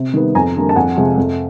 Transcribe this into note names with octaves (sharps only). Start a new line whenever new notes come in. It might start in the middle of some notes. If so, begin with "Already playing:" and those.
Already playing: C3
D#3 G3 B3
F2 G#5 A#5
D3 G3 A#3
A5
F2 F#5 G#5
C3 F3 G#3
F2